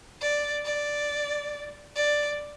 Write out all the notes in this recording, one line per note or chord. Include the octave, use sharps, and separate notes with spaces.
D5
D5
D5